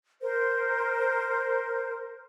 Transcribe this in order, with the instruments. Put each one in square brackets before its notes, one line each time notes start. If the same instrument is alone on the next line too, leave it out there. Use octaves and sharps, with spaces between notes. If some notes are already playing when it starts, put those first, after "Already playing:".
[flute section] A#4 C5